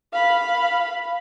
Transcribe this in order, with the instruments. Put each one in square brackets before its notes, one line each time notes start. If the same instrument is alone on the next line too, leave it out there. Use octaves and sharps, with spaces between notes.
[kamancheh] F5 B5